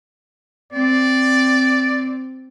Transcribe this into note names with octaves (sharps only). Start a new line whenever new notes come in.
C4 D5